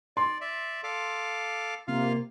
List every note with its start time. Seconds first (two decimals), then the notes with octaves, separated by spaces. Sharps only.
0.17 D5 C6
0.41 D5 E5
0.84 A4 F5 D6
1.88 C3 A#3 F4 F5